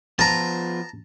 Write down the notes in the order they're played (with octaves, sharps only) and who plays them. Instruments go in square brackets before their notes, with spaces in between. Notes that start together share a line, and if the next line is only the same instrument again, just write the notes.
[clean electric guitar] F3 B3 F4 [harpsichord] A5 A#5